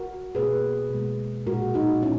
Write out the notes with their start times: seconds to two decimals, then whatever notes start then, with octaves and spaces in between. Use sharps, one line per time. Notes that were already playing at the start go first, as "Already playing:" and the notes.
Already playing: F#4 A#4
0.35 B2 A#3 G#4 B4
0.91 B2 G#3
1.47 A#2 G#3 F#4 A#4
1.74 D#4 F#4
2.02 A#2 A#3 C#4 E4